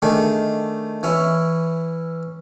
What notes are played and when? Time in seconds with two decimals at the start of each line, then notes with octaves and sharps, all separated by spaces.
0.02 D#3 A3 D4 G#4
1.03 E3 C#4 E4